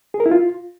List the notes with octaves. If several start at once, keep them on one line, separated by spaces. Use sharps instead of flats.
G#4
A#4
E4
F4